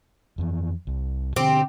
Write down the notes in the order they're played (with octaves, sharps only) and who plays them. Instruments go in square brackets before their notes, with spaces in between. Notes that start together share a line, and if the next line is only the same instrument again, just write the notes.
[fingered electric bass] F2 E3
C2
[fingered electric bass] B2 D3 D4 [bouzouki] C4 G4